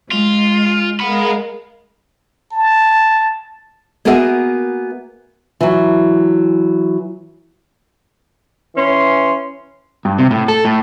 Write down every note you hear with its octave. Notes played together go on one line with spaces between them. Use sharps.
G#3 F4
G#3 A#4 F5 F#5 B5
A5
A#3 B3 F#4 G#4 A#4 E5
E3 F#3
E3 C#4 C6
G2
C3
A2
A4
A2